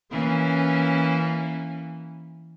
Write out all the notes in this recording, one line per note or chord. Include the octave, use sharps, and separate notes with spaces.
E3 A#3 C#4